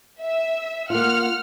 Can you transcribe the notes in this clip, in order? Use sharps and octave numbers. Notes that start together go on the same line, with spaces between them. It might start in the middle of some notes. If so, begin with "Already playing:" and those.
E5
A#3 F4 F#5 F6